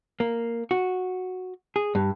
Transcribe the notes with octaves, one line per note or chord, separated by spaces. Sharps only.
A#3
F#4
G#4
G2